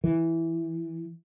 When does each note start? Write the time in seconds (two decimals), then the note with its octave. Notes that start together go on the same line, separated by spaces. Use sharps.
0.04 E3